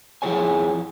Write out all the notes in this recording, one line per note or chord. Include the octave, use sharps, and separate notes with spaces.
F3 E4 F#4 G#4 C#5 G#5